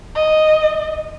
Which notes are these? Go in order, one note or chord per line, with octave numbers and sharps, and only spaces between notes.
D#5